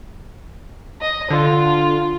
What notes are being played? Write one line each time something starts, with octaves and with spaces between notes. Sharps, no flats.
D#5
D3 F4